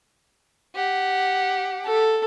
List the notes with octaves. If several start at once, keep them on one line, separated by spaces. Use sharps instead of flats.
G4 F#5
A4